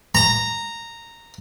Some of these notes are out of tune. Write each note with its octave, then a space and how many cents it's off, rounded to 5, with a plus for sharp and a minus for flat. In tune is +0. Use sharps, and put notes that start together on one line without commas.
A#5 -10